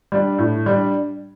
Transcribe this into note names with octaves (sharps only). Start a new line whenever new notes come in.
G3 D4
A2
G3 D4